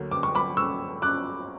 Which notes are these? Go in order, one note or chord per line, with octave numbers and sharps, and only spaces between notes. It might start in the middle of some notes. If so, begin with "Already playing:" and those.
Already playing: D2 D3 F#3 A#3
D6
C#6
B5 D6
C#6 E6
D6 F#6